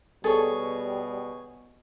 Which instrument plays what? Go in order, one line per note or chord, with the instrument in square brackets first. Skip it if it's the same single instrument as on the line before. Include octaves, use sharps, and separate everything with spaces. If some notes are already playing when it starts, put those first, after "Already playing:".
[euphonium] B2 [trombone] G3 [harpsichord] G#4 C#5 [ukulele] A4